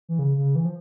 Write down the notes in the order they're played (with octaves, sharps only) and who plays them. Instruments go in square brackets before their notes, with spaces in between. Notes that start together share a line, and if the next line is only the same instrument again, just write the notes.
[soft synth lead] E3
C#3
C#3
E3
F3